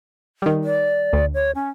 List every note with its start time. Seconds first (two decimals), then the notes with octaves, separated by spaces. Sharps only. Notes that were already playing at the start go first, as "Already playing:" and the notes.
0.42 D#3 G3
0.64 D5
1.13 D2
1.34 C#5
1.55 C#4